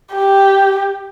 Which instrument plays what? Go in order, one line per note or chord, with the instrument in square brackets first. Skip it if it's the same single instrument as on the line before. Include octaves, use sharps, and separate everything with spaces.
[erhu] G4